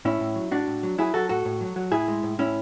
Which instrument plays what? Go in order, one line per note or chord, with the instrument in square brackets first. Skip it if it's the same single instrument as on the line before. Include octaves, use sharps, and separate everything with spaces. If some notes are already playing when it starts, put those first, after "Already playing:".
[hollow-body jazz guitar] A2 C#4 E4
A2
F#3
A2 D4 F#4
A2
F#3
F#3 E4 G#4
F#3 F#4 A4
A2 F#4 A4
A2
F#3
F#3
A2 E4 G#4
G#3
A2
A2 C#4 E4